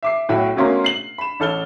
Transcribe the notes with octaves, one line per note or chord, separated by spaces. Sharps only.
E5 D6 C7
B1 A2 E4 F#4 G5
B2 A3 A#3 C#4 A#4 C6
C7 F#7
B5 E7
A1 A4 F6 G7